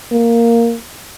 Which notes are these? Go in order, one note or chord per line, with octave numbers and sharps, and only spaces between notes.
A#3